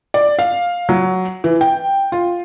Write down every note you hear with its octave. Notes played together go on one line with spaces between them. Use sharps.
D5
F5
F#3
E3
G5
F4